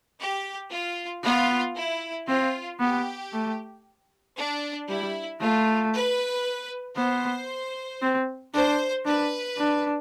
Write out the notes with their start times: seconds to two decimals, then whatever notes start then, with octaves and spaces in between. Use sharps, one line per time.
0.19 G4
0.72 F4
1.24 B3 F4
1.76 E4
2.28 C4 F4
2.80 B3 G4
3.33 A3
4.37 D4
4.88 G3 E4
5.41 A3 F4
5.93 B4
6.97 B3 C5
8.02 C4
8.53 D4 C5
9.05 D4 B4
9.58 D4